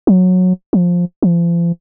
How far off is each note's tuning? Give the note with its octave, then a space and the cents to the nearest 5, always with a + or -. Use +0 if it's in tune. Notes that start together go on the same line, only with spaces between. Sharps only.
F#3 -15
F3 +10
F3 -40